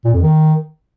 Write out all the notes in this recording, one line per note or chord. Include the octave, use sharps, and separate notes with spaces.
A#2
F2
D#3